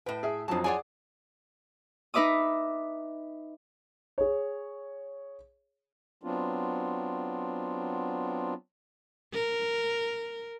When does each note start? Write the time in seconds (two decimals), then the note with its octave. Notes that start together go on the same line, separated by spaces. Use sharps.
0.06 A2 B4 G5
0.23 G#4 E5
0.48 F2 F3 F#3 D4 A5
0.64 F4 G#4 C#5 D5 F#5 G#5
2.14 D#4 B4 E5 D6 D#6
4.18 G#4 C#5
6.23 F#3 B3 C4 D4 F4
9.33 A#4